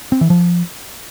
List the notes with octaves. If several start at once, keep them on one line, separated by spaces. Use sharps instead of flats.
C4
E3
F3